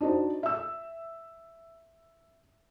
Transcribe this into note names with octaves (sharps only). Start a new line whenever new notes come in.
D4 D#4 F#4 C5
E5 E6